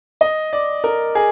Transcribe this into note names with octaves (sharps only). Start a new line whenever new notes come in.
D#5
D5
A#4
G#4